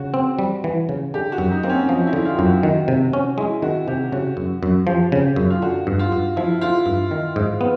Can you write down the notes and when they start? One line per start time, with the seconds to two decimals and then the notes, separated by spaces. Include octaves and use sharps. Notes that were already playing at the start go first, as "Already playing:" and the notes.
Already playing: C#3 F#4
0.14 C4
0.39 G3
0.64 E3
0.89 C#3
1.14 D3 G4
1.32 F#4
1.38 F#2
1.51 D#4
1.63 A#3 C4
1.69 C#4
1.89 F3 D#4
2.07 E4
2.13 D3
2.25 F4
2.39 F#2
2.45 F#4
2.63 D#3 F#4
2.88 C3
3.13 C#4
3.38 G#3 E4
3.62 D#3 F#4
3.88 C3 G4
4.12 C#3 F#4
4.37 F#2
4.63 F#2
4.87 F3 G4
5.12 C#3
5.36 F#2
5.50 F4
5.62 D3 F#4
5.87 G2
5.99 F4
6.12 G2
6.36 F3 E4
6.61 D3 F4
6.86 G2
7.11 D#3
7.36 G#2
7.61 B3